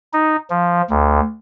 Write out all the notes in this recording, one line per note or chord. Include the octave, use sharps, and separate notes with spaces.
D#4
F3
D2